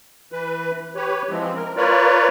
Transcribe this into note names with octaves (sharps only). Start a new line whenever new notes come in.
E3 B4
G4 B4 C#5
E3 F3 G#3 C4
A#4
F4 A#4 B4 C#5 D5